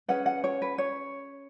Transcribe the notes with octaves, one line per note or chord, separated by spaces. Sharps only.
C#4 G#4 B4 F#5
F#5
C#5
B4
C#5